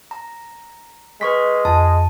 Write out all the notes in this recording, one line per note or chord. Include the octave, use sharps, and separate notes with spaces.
A#5
G#3 B4 C#6 B6
F2 G#5 A5